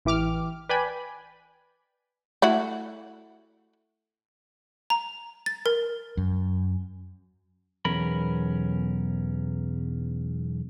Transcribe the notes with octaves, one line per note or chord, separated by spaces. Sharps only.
A1 E3 G4 D6 F6
B4 D5 G5 G#5 B5
A3 E4 F#4
A#5
A6
A#4
F#2
B1 E2 C#4 A#4 B5